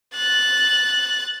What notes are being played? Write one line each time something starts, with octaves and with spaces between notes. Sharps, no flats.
F#6 A6